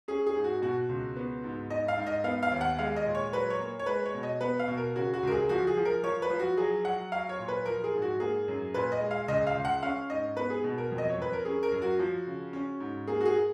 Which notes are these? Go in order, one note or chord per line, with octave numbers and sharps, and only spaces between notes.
C#4 G#4
G#4
G#2
F#4
B2 F#4
C#2
B3
G#2
G#2 D#5
F5
G#2
D#5
B3 F5
F5
D#2
F#5
G#3 F5
D#5
A#2
C#5
F#3 B4
C#5
A#3
C#5
G#3 B4
C#5
B2
D#5
B3 B4
F5
B2
A#4
C#3 F#4
F#4
C#2 A#4
G#4
F3 F#4
G#4
F3
A#4
F3 C#5
B4
F3
F#4
F#3 G#4
F#3 F#5
F#3 F5
C#5
A#2
B4
F3 A#4
G#4
G#2
F#4
A#3 G#4
F#2
A#2 B4
D#5
G#3
F5
C#2 D#5
F5
C#2
F#5
C#4 F5
G#2 D#5
B3 B4
G#4
B2
A#4
F2
D#5
C#5
F2 B4
A#4
C#4 G#4
A#4
F#2
F#4
F3
C#3
C#4
G#2
A#3 G#4
F#4
G#4